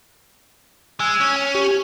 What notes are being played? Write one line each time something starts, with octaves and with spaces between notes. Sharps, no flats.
G#3 G#5 E6
C#4
G4 G#5